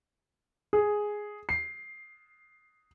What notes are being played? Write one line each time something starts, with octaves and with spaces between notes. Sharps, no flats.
G#4
C7